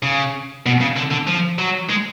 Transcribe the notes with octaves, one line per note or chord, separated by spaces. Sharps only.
C#3
B2
C#3
D3
D3
F3
F#3
G#3